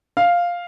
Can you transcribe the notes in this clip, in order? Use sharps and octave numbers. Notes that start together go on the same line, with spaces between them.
F5